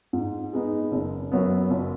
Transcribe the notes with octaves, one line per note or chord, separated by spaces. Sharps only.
G#2
G#3 B3 D#4
F#1
F#2 F#3 B3
F#1